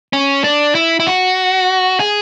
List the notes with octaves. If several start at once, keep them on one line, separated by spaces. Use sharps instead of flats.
C#4
D4
E4
E4
F#4
G#4